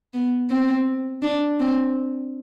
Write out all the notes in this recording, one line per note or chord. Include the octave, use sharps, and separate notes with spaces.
B3
C4
D4
C4